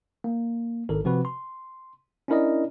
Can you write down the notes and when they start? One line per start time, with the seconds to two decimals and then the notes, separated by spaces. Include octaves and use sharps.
0.24 A#3
0.89 G#1 A4 A#4
1.04 C3 F3 C4 F#4 B4
1.25 C6
2.28 C#4 D4 E4 A#4 D5 D#5